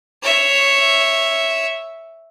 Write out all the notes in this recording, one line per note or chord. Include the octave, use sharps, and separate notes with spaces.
C#5 E5